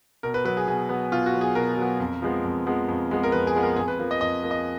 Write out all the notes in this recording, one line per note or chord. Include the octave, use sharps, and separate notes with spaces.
B2 A#4
B4
F#3 B3 B4
G#4
B2 G#4
F#3 B3
B2 F4
F#4
F#3 B3
G#4
B2 A#4
F#3 B3
F2
F3 G#3 B3
F2
F3 G#3 B3
F2
F3 G#3 B3
A#4
F2 B4
G#4
F3 G#3 B3
A#4
F2 G#4
B4
F3 A#3
D#5
F2 D#5
F3 A#3
D#5